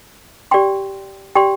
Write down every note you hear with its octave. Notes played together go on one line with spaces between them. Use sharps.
G4 D5 G5 C6
G4 D5 G5 C6